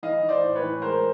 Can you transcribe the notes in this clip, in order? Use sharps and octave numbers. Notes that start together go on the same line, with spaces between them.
E3 D#5 F5
E3
C5 D5
A2
B4 C#5
E3
G#3 A#4 C5